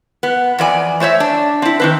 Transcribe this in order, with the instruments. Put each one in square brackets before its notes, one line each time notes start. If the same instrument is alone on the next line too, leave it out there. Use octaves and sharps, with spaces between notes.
[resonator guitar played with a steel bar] B3
F2 E3 D5 G#5
A3 C5 C#5 E5
D4
C4 E4
D#3 C4 B4